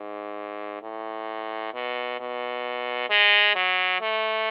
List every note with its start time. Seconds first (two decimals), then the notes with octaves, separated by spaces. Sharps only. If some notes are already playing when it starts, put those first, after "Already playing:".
Already playing: G#2
0.82 A2
1.74 B2
2.20 B2
3.10 G#3
3.55 F#3
4.01 A3